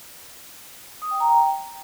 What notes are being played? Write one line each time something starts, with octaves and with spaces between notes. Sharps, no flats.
D#6
G5
A#5
G5